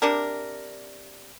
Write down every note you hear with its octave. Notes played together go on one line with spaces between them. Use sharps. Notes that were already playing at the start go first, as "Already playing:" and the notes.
C3 D4 A#4